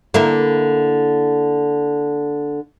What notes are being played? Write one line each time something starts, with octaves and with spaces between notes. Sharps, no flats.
D3 A#3 E4